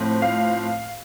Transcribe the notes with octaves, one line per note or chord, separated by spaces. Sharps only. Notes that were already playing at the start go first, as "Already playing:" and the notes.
Already playing: A2 F3 C4
F5